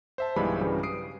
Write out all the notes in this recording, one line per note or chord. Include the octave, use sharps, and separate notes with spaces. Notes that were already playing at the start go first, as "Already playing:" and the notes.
C5 E5 A5
B1 G2 E3 G3 G#3 B5
G2 C#3 E3 F#3 G3
D#6 C7 D7